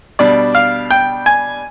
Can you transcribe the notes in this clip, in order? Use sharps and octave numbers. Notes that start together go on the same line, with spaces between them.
B2 G3 D4 D5
F5
G5
G#5